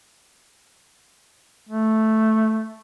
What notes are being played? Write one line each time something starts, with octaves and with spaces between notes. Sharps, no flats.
A3